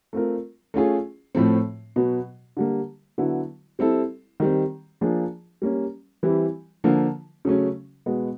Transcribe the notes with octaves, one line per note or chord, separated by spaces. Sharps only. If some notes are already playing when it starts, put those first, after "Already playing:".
A3 C4 F4 A#4
A3 C#4 F4 G#4
A2 F3 A3 C4
B2 F#3 B3
D3 G3 A#3
D3 F#3 B3 E4
G3 C4 E4 A4
D#3 G3 C4
F3 A#3 D4 F4 G#4
G3 A#3 C#4
E3 G3 C4 E4 G4
D3 F3 A#3
C#3 F#3 A3 C#4
B2 G#3 B3